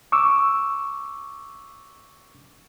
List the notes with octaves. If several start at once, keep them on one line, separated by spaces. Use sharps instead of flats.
C#6 D6 E6